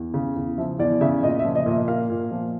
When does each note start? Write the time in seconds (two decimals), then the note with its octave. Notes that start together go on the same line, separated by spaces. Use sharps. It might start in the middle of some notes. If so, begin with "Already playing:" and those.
Already playing: E2
0.14 C#3
0.36 E2
0.58 F3 E5
0.79 E2 D5
1.01 C#3 E5
1.23 A#2 D#5
1.39 E5
1.44 F3
1.55 D#5
1.66 A#2
1.72 E5
1.88 A#3 F5
2.10 A#2
2.32 F3